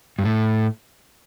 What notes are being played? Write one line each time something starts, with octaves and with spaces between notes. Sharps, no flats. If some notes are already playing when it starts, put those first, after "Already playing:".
G2
A2